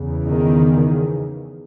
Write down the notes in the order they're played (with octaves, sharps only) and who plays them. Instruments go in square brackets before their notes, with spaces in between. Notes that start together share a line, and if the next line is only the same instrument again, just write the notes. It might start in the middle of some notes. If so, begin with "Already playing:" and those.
Already playing: [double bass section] E2 C#3
D#3